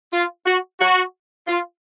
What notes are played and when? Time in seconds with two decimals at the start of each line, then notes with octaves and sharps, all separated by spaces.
0.13 F4
0.46 F#4
0.80 F#4
1.47 F4